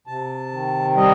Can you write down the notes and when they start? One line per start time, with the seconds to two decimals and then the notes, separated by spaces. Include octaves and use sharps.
0.07 C3 A5
0.51 D#3
0.95 G3 D#5